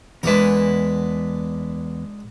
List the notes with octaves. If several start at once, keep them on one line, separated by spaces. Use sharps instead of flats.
E2 G#3 D4 A#4 B4